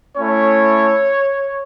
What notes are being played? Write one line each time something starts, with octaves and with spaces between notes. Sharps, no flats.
A3 C#4 E4 C#5